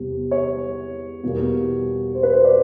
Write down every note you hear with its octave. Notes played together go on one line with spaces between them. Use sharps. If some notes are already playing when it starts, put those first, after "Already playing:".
Already playing: E2 C3 G3 B3
C#5
E2 B2 G3 A#3
C5
B4
C5
D5